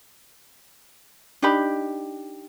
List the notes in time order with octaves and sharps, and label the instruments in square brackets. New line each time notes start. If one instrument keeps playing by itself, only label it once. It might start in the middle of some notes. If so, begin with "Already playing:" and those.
[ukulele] D4 D#4 G4 B5